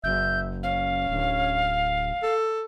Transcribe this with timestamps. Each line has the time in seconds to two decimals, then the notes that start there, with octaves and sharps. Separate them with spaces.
0.04 F#1 E5 G6
0.63 C#4 F5
1.09 D1
2.23 A4